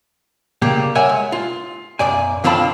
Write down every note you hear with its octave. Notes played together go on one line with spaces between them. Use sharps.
C#3 G3 A#3 G4
A#4 C#5 E5 F#5 G#5
G#3
F4
B1 F#2 D5 G#5
D3 D#3 C4 F4 A5 B5